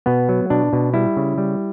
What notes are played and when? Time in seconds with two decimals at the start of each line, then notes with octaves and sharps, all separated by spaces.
0.06 B2 B3
0.29 F#3
0.50 B2 D4
0.73 B2
0.94 G3 E4
1.17 C#3
1.38 G3